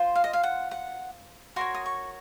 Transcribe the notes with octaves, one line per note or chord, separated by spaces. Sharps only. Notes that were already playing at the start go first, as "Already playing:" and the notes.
Already playing: F4 C5
F5
D#5
F5
F#5
F#5
F#4 A#4 C#5 C6
D#6
C#6